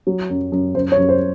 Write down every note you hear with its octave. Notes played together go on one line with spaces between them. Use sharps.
F#3
F#2
F#2
F#2 C5
C#5
F#2
C5